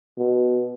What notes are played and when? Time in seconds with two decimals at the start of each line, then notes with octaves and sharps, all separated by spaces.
0.17 B2